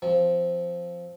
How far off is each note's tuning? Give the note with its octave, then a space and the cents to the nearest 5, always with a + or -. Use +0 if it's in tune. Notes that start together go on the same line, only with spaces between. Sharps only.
F3 +0 C4 +0